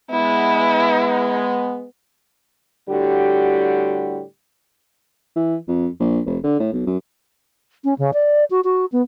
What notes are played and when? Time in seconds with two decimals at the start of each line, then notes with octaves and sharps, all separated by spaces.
0.11 G#3 B3 E4
2.89 A2 D3 G3 F#4 G4
5.36 E3
5.68 F2
6.00 A#1
6.26 F1
6.44 D3
6.60 A2
6.73 B1
6.87 F#2
7.84 C#4
7.98 C#3
8.13 D5
8.50 F#4
8.64 F#4
8.92 B3